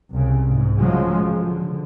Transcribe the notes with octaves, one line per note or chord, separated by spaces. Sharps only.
C2 C#3
G#2
C#3 F3 F#3 G#3
D3